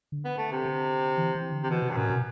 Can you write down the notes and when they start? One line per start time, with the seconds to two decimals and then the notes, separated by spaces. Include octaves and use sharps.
0.12 D3
0.25 B3
0.38 A3
0.52 C3
0.65 D3
1.17 E3
1.35 E3
1.52 D3
1.63 C3
1.70 B2 E3
1.83 C3
1.90 G2
1.97 F#2 A2
2.10 B2